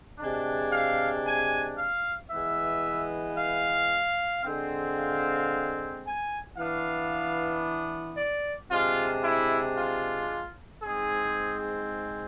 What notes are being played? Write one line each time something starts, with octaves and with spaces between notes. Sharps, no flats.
C3 G#3 D4
F5
G#5
F5
E3 G#3 B3 E5
F5
D3 G#3 C4
F5
G#5
E3 B3 D4 F5
D5
C3 G#3 D4 F4
E4
F4
G#2 G#3 C4 G#4